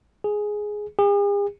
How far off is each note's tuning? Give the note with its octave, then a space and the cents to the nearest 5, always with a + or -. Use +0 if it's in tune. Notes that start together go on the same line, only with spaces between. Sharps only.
G#4 +5
G#4 -45